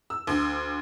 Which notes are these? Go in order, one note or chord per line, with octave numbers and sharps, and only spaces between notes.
E6
D2